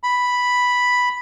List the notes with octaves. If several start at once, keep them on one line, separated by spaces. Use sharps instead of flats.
B5